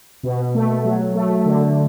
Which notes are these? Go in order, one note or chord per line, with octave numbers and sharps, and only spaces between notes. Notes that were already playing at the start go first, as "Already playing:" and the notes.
B2
A3
F#3
A3
D3